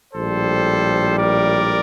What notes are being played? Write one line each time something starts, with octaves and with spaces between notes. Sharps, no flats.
A#1 A2 G3 A4 C5
A#4 D5